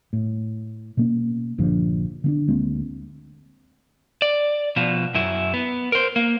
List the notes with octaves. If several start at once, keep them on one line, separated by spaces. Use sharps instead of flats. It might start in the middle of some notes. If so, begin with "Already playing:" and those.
A2
B2 A#3 C#4
A#1 G2 D3 F3
D3 B3 D4
D2 G#3 A#3 C4
D5
B2 F3
F#2 E4
B3
A#4 C5
A#3